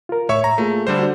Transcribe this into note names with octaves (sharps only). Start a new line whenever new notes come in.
F4 A#4
A2 C#5 E5 C#6
A#5
A3 A#3 F4 G#4
D3 G3 C5
D4 F#4